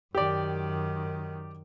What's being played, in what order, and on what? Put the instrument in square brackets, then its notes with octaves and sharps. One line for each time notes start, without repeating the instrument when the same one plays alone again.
[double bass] F#2 D#3 [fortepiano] G4 D5